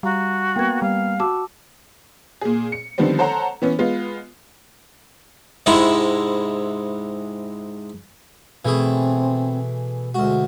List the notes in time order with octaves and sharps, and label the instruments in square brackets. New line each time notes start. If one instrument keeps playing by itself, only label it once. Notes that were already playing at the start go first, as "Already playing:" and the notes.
[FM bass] G3 [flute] F#4 [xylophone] F5 A#5
[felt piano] A#3 B3 [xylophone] G5 G#6
[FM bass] G3 [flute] F5
[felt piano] F#4 [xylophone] A5 D6 E6
[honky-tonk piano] A#2 G#4
C#7
D3 D#3 F3 G3 B3 C4
A4 C5 C#5 F#5 A#5
E3 B3 C#4
G#3 B3 F4
[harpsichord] G#2 C3 G#3 E4
[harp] B2 G#5 [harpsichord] E3 A3 G#4 [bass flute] C4
[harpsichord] D2 F#4 [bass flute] G#3